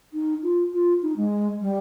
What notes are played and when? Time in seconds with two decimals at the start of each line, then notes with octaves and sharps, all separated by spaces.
0.13 D#4
0.42 F4
0.72 F4
1.02 D#4
1.16 G#3
1.61 G3